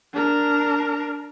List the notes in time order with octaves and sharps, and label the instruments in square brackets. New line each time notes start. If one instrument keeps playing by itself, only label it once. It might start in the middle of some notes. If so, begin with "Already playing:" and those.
[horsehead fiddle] D4 A#4